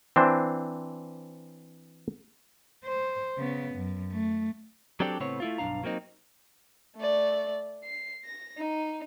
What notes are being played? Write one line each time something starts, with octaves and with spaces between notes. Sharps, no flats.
E3 C4 D4 C5
C5
C#3 B3
F#2
A3
F#3 C4 D4 G4 A4 D5
A2 C#3 B3 C4 C#5
A3 E4 F4
B1 G2 G#3 D4 F5 A#5
F#3 A#3 C4 D#4
A3 D5
C7
A#6
D#4